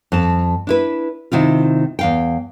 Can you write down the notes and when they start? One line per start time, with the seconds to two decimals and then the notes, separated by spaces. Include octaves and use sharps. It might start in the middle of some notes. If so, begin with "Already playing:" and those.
0.12 F2 A5
0.67 D4 E4 B4
1.32 C3 D#3 E4 F4
1.99 E2 F5 G5